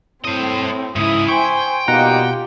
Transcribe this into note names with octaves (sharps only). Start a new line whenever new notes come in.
A2 C4 C5 D#5
G#2 C#3 E4 D#6
C5 G5 G#5 C#6
B2 G3 A#3 D#4 F4 G4 F#5 A#5